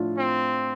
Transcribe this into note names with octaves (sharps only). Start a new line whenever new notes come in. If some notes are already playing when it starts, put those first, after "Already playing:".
Already playing: A2 F3 D4 F4
C4